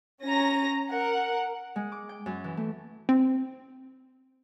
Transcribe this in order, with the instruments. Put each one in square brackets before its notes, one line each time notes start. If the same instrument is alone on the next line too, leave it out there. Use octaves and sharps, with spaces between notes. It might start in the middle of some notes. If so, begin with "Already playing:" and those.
[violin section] C#4 A#5 A#6
A#4 F#5
[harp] G#3
D6
G5
F#2
E3
A3
[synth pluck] C4